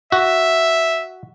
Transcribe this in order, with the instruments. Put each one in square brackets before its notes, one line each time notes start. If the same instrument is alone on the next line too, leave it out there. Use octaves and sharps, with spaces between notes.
[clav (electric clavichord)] F#4 [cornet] E5